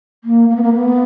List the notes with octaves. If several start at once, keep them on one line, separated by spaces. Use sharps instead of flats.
A#3
A#3
B3
A#3
B3